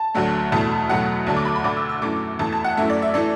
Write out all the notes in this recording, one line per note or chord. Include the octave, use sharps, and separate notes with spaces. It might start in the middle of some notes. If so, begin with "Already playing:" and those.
Already playing: A5
D2 D3 F#3 A3
E2 B2 A3 A5
E2 B2 F#3 A3 F#5
D2 D3 F#3 A3 A5
D6
B5
B5
D2 D3 A3 D6
E6
E6
F#2 E3 A3 D6
E2 E3 A3 A5
A5
F#5
F#2 E3 A3 E5
D5
E5
E3 A3 D5